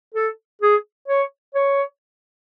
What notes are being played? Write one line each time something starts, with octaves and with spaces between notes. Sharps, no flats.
A4
G#4
C#5
C#5